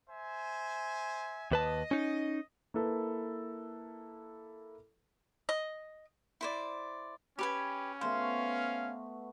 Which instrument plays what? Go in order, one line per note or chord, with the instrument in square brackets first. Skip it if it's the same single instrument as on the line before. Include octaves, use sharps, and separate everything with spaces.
[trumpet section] C5 E5 G#5
[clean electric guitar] D#2 B4 A5 [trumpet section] D#5
[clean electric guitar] C#4 D#4
[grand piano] A#3 E4 A4 B4
[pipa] D#5
[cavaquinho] E4 C5 D5
[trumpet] C#4 [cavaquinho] G4 B4 G#5 [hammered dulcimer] B5
[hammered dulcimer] A3 B3 F#4 [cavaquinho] C5 [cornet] F5